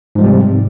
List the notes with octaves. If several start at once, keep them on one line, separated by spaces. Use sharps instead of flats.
G#2 C3 F3 G3 C4